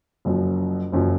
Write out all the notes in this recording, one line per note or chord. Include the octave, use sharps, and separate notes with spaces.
F#1 F#2 F3
F#1 F#2 F3